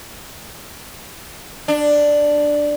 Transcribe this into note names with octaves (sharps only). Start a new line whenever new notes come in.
D4